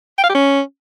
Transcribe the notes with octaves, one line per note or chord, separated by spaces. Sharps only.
G5
F5
G4
C#4